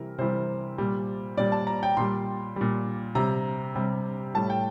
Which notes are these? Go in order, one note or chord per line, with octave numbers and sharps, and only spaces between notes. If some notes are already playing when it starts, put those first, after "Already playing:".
Already playing: C3 E3 G3 A#4
C3 E3 G3 C5
A#2 G3
A#2 G3 D5
A5
A#5
G5
A#2 G3 C6
A#2 G3
C3 G3 A#5
C3 G3
A2 G3 A5
G5